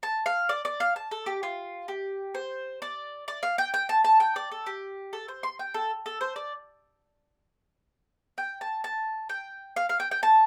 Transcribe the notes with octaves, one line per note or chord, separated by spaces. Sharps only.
A5
F5
D5
D5
F5
A5
A4
G4
F4
G4
C5
D5
D5
F5
G5
G5
A5
A5
G5
D5
A4
G4
A4
C5
C6
G5
A4
A4
C5
D5
G5
A5
A5
G5
F5
F5
G5
G5
A5